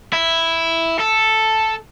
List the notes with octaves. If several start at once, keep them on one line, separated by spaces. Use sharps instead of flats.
E4
A4